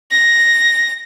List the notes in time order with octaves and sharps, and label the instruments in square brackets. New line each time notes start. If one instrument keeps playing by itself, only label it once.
[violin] A#6